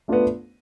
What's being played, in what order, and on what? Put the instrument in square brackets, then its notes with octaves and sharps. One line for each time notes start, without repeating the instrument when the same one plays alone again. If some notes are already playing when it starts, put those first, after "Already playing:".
[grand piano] A3 D4 F4 [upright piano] B3